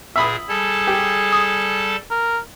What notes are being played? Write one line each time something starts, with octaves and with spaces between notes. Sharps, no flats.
A#2 G#4 E5 B5 D#6
G3 G#4 A4 A5
G4
D#6
A#4